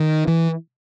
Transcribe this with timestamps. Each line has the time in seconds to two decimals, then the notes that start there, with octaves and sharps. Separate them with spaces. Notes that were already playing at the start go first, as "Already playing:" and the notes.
Already playing: D#3
0.28 E3